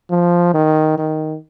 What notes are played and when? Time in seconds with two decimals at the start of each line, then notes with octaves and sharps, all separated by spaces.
0.10 F3
0.54 D#3
0.98 D#3